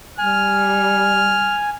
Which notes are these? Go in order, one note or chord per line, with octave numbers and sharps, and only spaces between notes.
G3 G#5 F6